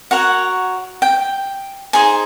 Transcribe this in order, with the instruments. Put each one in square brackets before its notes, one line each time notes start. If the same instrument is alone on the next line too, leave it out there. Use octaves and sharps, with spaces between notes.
[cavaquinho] F#4 A#4 C#5 F#5
G5
D#4 G#4 C5 G#5